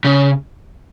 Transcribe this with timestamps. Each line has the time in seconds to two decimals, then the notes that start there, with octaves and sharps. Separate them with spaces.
0.04 C#3